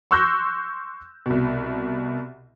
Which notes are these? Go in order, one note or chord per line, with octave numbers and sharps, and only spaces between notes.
C6 C#6 E6 F#6 G6 A#6
C2 B2